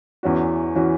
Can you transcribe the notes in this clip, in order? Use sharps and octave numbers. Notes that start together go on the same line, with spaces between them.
E2 E3 C#4 F#4
E3 C#4 F#4